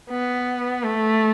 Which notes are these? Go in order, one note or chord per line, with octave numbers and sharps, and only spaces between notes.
B3
A3